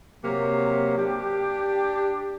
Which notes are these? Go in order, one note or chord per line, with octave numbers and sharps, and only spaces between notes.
C3 F#3 A#3
D4 G4